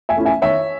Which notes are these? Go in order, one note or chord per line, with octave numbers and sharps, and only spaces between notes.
E5 G#5
A3 C#4 E4
E5 G#5
D#3 C#5 E5